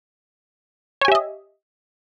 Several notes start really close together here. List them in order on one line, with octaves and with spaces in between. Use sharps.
C#5 G#5 G4 E5 D#5